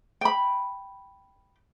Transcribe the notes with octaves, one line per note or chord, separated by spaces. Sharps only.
G5 B5